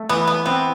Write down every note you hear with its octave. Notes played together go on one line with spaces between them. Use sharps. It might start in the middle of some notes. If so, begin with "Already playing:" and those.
Already playing: A3
E3 B3
B3
B3 C4